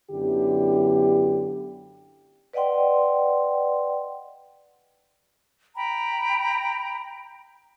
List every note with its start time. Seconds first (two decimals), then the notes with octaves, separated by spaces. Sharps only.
0.11 F#2 D3 B3 E4 G4
2.53 B4 D5 D#5 F#5 G5 C6
5.75 G5 A#5 B5